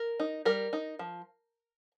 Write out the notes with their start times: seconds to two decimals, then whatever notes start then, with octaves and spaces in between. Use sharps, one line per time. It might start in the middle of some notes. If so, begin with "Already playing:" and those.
Already playing: A#4
0.19 D#4
0.45 G3 A#4
0.73 D#4
0.99 F3